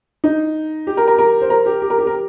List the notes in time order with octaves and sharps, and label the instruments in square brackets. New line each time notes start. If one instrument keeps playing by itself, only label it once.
[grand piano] D#4
G4
A#4
A#4
A#4
C5
A#4
G4
G4
A#4
G4
A#4